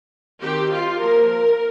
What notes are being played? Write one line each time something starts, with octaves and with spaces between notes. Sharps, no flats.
D#3 C4 G4
F4
F3 A#3 A#4